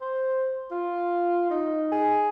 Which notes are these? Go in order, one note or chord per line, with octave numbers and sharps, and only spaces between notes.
C5
F4
D#4
G#4